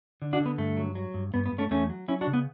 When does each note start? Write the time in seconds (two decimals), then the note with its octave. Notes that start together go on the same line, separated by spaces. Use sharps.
0.22 D3
0.33 D4 F#4
0.40 D3
0.46 B3
0.58 G2 A3
0.77 F#3
0.95 F#3
1.14 G2
1.34 G2 B3
1.46 B3
1.52 G2
1.58 A3 C#4
1.71 E2 A3 C#4
1.90 F#3
2.08 F#3 C#4 E4
2.21 D4 F#4
2.27 C#3
2.33 B3